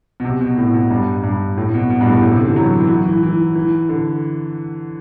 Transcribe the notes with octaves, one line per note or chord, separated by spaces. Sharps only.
B2
C3
B2
A2
B2
G2
G2
A2
B2
B2
G2
A2
A2
C3
D3
E3
F#3
E3
F#3
E3
E3
E3
D3